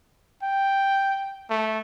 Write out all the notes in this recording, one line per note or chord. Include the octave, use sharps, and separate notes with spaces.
G5
A3